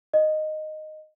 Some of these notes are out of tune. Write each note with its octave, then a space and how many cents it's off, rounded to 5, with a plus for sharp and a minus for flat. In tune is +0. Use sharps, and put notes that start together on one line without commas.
D#5 -10